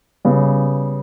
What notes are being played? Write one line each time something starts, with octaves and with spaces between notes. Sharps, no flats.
C#3 G3 B3